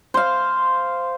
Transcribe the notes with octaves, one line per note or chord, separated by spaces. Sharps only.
C5 F5